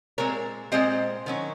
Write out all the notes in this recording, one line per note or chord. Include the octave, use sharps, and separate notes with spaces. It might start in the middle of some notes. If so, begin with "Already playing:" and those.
A#2 G#3 C4 A#4 C#5
A#2 G#3 C4 C5 D#5
D#3 F#3 C#4